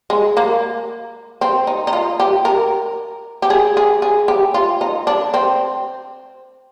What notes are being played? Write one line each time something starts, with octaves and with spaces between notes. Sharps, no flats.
G#3
A#3
C4
D#4
D#4
F4
G4
A#4
G4
G#4
G#4
G#4
G4
F4
D#4
D4
C4